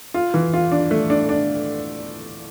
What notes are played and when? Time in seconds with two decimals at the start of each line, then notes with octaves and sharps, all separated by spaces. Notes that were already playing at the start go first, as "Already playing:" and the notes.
0.14 F4
0.34 E3
0.54 F4
0.72 D4
0.91 A3
1.10 D4
1.29 D4